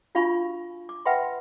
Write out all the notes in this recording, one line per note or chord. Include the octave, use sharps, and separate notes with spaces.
D4 F4 F#4 F5 B5 C#6
D6
B4 E5 F#5 G5 B5 C6